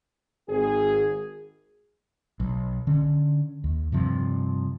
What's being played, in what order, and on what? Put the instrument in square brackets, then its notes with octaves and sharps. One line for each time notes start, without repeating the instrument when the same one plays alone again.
[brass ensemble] G#1 G#4
[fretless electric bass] B1
D3 C#4
D#2
G2 C3 F3